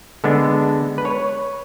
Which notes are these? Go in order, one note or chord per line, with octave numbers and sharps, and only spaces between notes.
D3 G#3 B3 D4 A4
B4
C#5